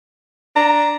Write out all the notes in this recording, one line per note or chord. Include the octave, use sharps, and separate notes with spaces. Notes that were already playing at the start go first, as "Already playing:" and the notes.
D4 A#5